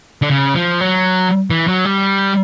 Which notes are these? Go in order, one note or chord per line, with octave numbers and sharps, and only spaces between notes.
D3
C#3
F3
F#3
E3
F#3
G3